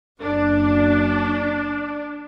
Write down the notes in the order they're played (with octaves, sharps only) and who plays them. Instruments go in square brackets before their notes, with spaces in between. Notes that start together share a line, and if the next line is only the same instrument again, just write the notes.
[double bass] F#1 F#2 [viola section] D4